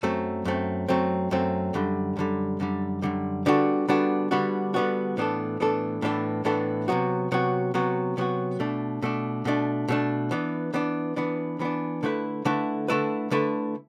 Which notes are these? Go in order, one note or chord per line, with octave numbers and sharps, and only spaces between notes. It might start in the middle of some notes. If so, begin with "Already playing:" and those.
F#2 F#3 A3 C4
F#2 F#3 A3 C4
F#2 F#3 A3 C4
F#2 F#3 A3 C4
F#2 D3 G3
F#2 D3 G3
F#2 D3 G3
F#2 D3 G3
D3 G3 B3 D4 F#4
D3 G3 B3 D4 F#4
D3 G3 B3 D4 F#4
D3 G3 B3 D4 F#4
A2 E3 B3 D4 A4
A2 E3 B3 D4 A4
A2 E3 B3 D4 A4
A2 E3 B3 D4 A4
C3 F#3 B3 F#4
C3 F#3 B3 F#4
C3 F#3 B3 F#4
C3 F#3 B3 F#4
B2 A3 D4
B2 A3 D4
B2 A3 D4
B2 A3 D4
E3 B3 D4
E3 B3 D4
E3 B3 D4
E3 B3 D4
D3 A3 E4 B4
D3 A3 E4 B4
D3 A3 E4 B4
D3 A3 E4 B4